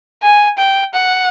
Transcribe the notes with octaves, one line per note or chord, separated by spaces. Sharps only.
G#5
G5
F#5